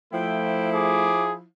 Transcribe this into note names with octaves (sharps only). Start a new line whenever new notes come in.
F3 A3 E4 G5
G#4 D6